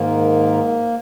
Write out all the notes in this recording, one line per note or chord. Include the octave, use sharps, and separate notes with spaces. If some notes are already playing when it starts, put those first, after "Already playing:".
Already playing: G#2 D#3 A#3